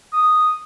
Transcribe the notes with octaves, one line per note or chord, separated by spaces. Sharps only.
D#6